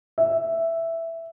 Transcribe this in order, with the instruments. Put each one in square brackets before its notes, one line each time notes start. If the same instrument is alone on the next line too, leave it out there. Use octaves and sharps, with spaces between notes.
[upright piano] E5